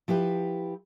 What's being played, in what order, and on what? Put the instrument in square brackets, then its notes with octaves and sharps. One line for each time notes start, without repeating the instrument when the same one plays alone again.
[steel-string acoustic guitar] F3 E4 G4 B4